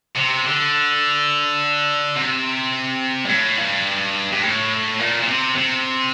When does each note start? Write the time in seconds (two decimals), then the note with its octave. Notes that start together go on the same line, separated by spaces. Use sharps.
0.16 C3
0.45 D3
2.15 C3
3.25 G2
3.29 A2
3.57 G2
4.32 G2
4.43 A2
5.00 A#2
5.23 A#2
5.28 C3
5.56 C3